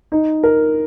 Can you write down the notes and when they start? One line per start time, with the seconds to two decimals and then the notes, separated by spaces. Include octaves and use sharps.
0.12 D#4
0.43 A#4